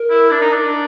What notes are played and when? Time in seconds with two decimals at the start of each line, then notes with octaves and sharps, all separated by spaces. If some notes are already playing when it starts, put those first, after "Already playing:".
Already playing: A#4
0.10 E4
0.31 D4
0.41 D#4
0.52 D4